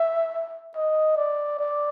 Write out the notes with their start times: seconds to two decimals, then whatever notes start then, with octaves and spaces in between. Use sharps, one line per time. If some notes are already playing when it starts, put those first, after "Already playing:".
Already playing: E5
0.76 D#5
1.17 D5
1.59 D5